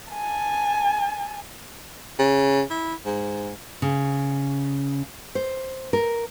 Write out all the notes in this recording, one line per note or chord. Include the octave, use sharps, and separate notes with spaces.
G#5 A5
C#3
E4
G#2
C#3
C5
A#4